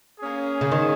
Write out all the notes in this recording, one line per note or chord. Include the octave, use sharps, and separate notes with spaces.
A#3 C#4 G#4
C#3
D#3